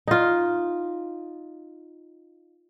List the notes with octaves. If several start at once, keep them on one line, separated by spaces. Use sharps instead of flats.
D#4 F4